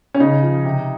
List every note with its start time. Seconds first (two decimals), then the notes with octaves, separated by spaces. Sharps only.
0.14 C#4
0.20 C#3 D#4
0.43 F3
0.64 C3